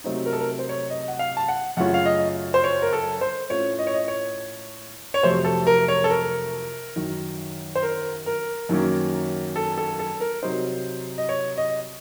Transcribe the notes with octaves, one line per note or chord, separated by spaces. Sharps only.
C3 F#3 A3 C4 D#4
A#4
A4
A#4
C5
C#5
D#5
F#5
F5
A5
F#5
F#2 C#3 A3 C#4 F4 F#5
F5
D#5
C5
C#5
A#4
A4
C5
A2 A3 C#4 F4 C#5
D#5
C#5
D#5
C#5
C#5
F2 C3 F#3 A3 C5
A4
A#4
C#5
A4
A#4
F#2 D#3 F#3
C5
A#4
A#4
F#2 D#3 F#3 A#3 C#4
A4
A4
A4
A#4
C3 F#3 C4 D#4 C5
D#5
C#5
D#5